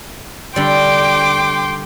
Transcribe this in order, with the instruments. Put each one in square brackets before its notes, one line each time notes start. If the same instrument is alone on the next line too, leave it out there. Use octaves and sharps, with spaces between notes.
[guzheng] D3 G3 [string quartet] G5 C6 D6